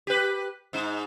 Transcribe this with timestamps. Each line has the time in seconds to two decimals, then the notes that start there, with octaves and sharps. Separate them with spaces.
0.07 G4 B4
0.73 G#2 D#4